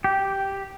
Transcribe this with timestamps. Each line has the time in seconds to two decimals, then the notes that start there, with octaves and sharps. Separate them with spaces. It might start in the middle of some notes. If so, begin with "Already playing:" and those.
0.04 G4